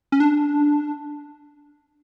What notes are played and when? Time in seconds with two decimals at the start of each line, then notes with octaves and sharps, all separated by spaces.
0.12 C#4
0.20 D4